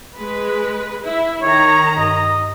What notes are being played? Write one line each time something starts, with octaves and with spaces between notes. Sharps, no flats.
G#3 B4
E4
D#3 C#5 A#5
G2 D#5